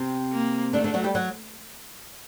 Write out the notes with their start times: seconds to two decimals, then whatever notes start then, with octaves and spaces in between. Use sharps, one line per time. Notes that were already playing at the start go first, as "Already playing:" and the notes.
Already playing: C3 C4
0.32 A#3
0.73 D3 A3 D4
0.84 D3 D4
0.94 F#3 F#4
1.04 G3 G4
1.15 F#3 F#4